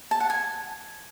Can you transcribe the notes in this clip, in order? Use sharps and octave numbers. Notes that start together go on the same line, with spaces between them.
A5
F#5
G#5